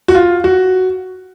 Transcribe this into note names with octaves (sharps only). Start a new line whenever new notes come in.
F#4
F4
F#4